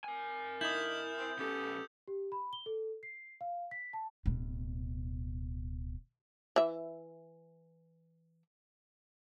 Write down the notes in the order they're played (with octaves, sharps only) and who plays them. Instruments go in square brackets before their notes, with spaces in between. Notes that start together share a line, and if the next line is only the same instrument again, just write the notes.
[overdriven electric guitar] A#4 G#5
[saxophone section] D3 A#3 D#4 [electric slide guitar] E4 [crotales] D#6 G6
[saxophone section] C4
[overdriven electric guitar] B1 C#4 [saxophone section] B3 G4 A4
[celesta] G4
B5
G7
A4
C7
F5
B6
A5
[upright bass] D1 B2
[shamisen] E3 E5